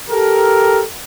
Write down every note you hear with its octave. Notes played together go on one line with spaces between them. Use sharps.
G4 A4 A#4